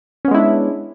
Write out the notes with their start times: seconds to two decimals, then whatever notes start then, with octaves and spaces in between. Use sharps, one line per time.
0.25 C#4
0.28 B3
0.31 G#3
0.34 E4
0.38 D4